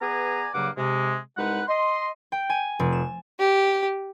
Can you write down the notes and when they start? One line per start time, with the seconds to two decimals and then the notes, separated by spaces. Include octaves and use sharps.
0.02 B3 G#4 B4 D5 G#5 A#5
0.54 G2 C#3 F#3 A#3 F#5 D6
0.77 C3 G#3
1.37 C2 G#3 D#4 B4 F#5
1.68 D#5 C6
2.32 G5
2.50 G#5
2.79 F1
2.92 E7
3.39 G4